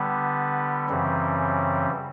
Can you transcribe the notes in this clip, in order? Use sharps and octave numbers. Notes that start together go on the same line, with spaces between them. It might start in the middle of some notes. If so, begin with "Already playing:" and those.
Already playing: D3 G3 B3
F#2 C#3 E3 G3 C4